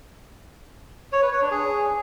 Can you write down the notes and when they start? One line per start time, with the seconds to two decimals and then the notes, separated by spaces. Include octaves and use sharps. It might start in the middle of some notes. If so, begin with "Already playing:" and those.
1.13 C#5
1.22 B4
1.32 C#5
1.41 D4
1.51 G#4